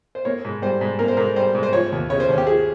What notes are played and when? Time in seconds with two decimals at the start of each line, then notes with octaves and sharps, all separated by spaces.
0.15 C5
0.25 A#3 C#5
0.45 G#2
0.62 G3 C5
0.81 G#2
0.99 A#3 A#4
1.08 C5
1.17 G#2 A#4
1.36 G3 C5
1.55 G#2
1.63 C5
1.73 F3 C#5
1.92 D#2
2.10 C#3 C#5
2.20 C5
2.29 D#2 C#4
2.38 G4
2.47 F3 G#4